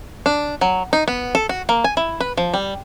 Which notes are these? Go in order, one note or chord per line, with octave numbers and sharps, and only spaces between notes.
D4
F#3
D#4
B3
A4
F#4
A#3
G#5
E4
B4
F3
G3